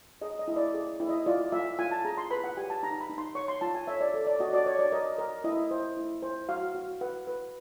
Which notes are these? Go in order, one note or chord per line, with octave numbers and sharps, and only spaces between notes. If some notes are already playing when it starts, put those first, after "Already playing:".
G#4 D#5
D#5
E4
D5
G#4
E4
D#5
F4 D5
F4 E5
F4 G#5
A5
G#4 A#5
C6
B4 B5
F#5
G4 G#5
A5
D#4 A#5
B5
D#4
C6
C#5 C#6
C6
F4 A5
G#5
C#5 E5
D5
A4
D5
F#4 D#5
D5
C#5
D5
A#4 D#5
A#4
E4 D#5
C5
E4
C5
F#4 F5
F#4
B4 F#5
B4